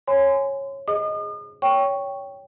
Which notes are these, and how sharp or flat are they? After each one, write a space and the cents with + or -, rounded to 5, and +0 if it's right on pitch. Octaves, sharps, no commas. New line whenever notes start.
C#5 -15 G#5 +0 C6 -30
G#4 +0 D#5 +0 D#6 -45
C#5 +15 G5 +0 C#6 +0